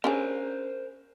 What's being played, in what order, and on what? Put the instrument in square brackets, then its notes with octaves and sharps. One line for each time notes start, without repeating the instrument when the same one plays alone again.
[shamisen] C#4 D4 G#4 [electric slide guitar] A#4 C5